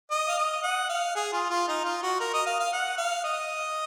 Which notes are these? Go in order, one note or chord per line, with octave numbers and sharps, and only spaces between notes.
D#5
F5
D#5
F#5
F5
G#4
F4
F4
D#4
F4
F#4
A#4
D#5
F5
F5
F#5
F5
D#5